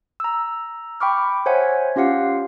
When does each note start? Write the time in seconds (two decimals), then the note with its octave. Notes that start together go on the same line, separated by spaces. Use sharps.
0.20 A#5 E6
1.00 G5 B5 C#6 D6 F6
1.46 C5 C#5 E5 F#5 G#5
1.96 C#4 F4 G4 F5 F#5